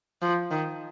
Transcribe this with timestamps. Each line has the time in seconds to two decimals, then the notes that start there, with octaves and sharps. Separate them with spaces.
0.22 F3
0.51 D#3